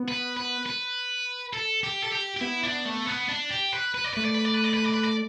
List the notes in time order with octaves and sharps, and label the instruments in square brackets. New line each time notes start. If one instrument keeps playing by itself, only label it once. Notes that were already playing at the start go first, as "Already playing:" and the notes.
Already playing: [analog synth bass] B3
[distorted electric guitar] B4
B4
B4
A4
G4
A4
G4
G4
[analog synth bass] B3 [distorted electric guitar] E4
[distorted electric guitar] D4
A3
B3
D4
G4
B4
B4
D5
[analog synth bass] A3 [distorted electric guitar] B4
[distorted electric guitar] D5
B4
D5
B4
D5
B4
D5
B4
D5